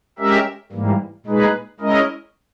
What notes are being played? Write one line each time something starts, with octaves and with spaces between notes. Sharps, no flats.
G#3 C#4 G4 A#4 E5
G#2 E3 G3 A#3
A#2 G#3 D#4 G#4 B4
G#3 C#4 E4 A#4 D#5